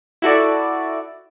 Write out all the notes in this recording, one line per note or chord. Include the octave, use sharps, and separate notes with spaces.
E4 F#4 A4 D5